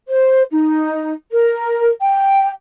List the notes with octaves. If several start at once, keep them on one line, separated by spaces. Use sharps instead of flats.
C5
D#4
A#4
G5